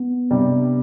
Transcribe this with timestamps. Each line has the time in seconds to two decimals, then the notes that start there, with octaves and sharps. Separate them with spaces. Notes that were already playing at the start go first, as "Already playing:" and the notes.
Already playing: B3
0.31 C3 G3 D4